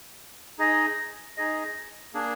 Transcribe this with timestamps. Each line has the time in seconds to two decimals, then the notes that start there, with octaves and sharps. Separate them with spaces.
0.59 D#4 G#4 D#5
1.37 D#4 G#4 D#5
2.13 A#3 D4 G#4